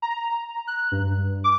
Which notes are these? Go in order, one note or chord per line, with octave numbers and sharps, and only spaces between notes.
A#5
F#6
G2
D6